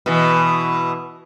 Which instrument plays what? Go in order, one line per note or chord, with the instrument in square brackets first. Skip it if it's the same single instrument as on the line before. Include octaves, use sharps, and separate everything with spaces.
[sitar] B2 E3